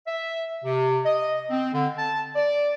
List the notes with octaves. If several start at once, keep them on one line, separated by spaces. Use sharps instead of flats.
E5
C3
D#5
C4
D3
A5
D5